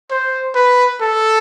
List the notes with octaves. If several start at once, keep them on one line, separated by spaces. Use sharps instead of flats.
C5
B4
A4